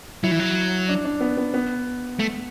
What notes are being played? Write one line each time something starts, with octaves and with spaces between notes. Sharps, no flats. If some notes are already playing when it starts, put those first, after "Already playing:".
F#3 E4
E3
F#3
D4
D4
B3
B3
B3
A3